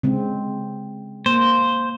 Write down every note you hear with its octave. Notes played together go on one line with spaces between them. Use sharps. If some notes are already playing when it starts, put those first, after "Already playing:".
C#3 G#3 C4
A#3 C5